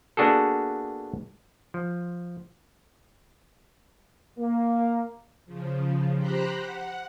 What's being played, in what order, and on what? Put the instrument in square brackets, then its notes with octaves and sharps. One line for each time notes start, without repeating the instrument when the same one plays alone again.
[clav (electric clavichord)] A#3 B3 D4 F#4 G#4 A4
F3
[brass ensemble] A#3
[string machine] C#3 F3
G4 C5 A#5 B5 F#6
F#5